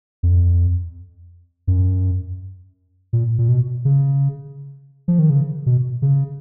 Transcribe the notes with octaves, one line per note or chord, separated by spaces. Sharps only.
F2
F#2
A#2
A#2
B2
C#3
F3
D#3
C#3
B2
C#3